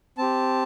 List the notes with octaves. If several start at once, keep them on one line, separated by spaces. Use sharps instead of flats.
C4 G4 A5